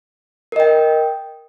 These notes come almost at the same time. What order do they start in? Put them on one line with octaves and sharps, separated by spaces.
A#4 D#5 G5